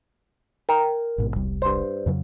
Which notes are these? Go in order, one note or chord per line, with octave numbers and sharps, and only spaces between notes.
A#4 G5
A1 G#2 B2
E1 C2 G3
G2 C5
F2 C#3 F#3